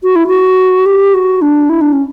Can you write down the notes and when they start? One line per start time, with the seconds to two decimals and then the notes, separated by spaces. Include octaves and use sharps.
0.03 F#4
0.16 E4
0.27 F#4
0.86 G4
1.14 F#4
1.41 D4
1.69 E4
1.81 D4
1.92 C#4